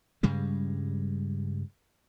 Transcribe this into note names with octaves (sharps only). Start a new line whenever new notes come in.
G2 C#3 G3 G#3